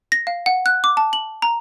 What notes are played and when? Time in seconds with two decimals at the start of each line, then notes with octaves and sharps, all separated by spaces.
0.12 A#6
0.27 F5
0.46 F#5
0.66 F#6
0.84 D6
0.97 A5
1.13 F#7
1.42 A#5